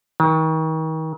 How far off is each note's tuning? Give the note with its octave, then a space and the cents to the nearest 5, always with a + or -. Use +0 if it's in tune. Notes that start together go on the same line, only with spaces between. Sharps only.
D#3 +35